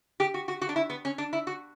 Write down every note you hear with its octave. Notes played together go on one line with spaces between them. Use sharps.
G4
F#4
F#4
F#4
D4
E4
B3
C#4
D4
E4
F#4